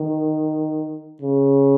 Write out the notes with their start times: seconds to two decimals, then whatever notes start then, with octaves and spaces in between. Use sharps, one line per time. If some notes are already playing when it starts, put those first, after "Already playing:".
Already playing: D#3
1.22 C#3